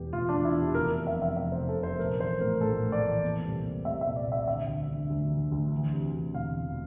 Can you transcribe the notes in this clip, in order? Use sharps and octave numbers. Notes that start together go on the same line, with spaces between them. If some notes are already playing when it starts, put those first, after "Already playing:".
Already playing: E1 E2 E3 G4
E1 F4
D4
E1
E4
E3
G4
F1 A#4
C3
E5
F2
E5
F1 E5
C5
F1
A4
C3 C5
A#1 A#4
E3 C5
A2 A#4
A#1 A4
A#1
D5
E3
A#2
C2
A#2
C2 E5
E5
A#2
D5
C2 E5
D3 E5
D2
D3
D2
D3
D2
E3
C3
D2
E1 F5
E3